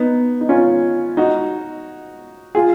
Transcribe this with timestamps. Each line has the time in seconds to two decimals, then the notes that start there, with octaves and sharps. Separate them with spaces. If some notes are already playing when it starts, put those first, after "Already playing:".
Already playing: B3 D#4
0.41 D#4
0.49 C#4 F4
1.17 D#4 F#4
2.55 F4 G#4